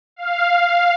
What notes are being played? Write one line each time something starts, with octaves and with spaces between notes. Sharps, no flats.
F5